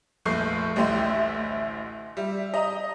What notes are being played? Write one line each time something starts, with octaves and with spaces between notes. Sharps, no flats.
F1 A#1 A3 C#6 G6 C7
A1 D2 G4 D#5 E5 C6
G3 E5
D#5 A#5 D#6